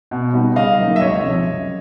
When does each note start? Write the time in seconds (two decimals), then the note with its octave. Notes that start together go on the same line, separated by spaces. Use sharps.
0.11 B2
0.33 G3 B3 D#4
0.56 C#3 D#5 F5
0.79 F#3 A#3 D#4
0.96 E5
1.00 C#2 C#5 D#5
1.23 C3 F3
1.46 F#2